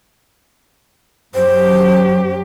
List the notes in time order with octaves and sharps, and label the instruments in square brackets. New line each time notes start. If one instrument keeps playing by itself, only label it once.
[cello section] F#2 F#3 G4 [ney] C5